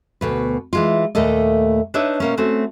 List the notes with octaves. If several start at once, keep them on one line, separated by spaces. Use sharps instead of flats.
D2 B2 B4
E3 G#3 F4
D#2 A#2 A3 A4 D#5
D4 D#4 B4 C#5 E5
B2 A#3 C#4
A3 C4 C#4 F#4